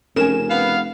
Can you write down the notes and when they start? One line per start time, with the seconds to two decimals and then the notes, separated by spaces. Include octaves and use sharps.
0.16 F1 C#3 A#4 G#5 E7
0.50 B3 F5